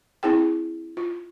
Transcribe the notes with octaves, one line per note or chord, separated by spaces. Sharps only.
C4 E4 G#4 G5
F4